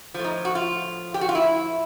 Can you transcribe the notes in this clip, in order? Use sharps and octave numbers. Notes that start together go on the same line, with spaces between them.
A2 F3
D#4
F#4
F4
G4
F#4
F4
E4